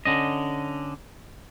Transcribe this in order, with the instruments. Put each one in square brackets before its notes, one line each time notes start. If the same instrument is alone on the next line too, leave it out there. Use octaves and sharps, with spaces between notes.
[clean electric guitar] D3 C#4 D#5